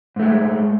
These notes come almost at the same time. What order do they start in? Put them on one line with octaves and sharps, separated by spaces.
G#2 A3 G#3